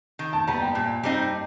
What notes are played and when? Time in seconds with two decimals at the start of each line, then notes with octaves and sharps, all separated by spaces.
0.19 D#3
0.33 A5
0.47 G3 B3 A#5
0.62 G5
0.75 A#2
1.03 G3 C4 D#4